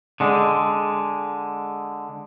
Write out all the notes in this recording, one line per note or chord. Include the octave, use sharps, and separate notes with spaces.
D3 G#3